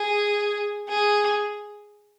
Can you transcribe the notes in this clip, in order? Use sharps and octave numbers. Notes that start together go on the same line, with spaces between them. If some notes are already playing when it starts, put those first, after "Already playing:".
Already playing: G#4
G#4